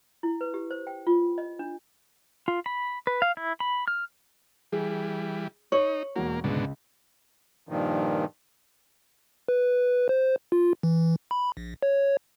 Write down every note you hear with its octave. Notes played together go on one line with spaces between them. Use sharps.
E4
B4
G4
C5
G5
F4
D#5
D4
F4
B5
B4
F5
E4
B5
F6
E3 G3 G#4
D#4 C#5 F#7
E1 A#3 F#4
C#2 G#2 B2 D3
G2 A#2 D#3 F3
B4
C5
F4
E3
B5
A#1
C#5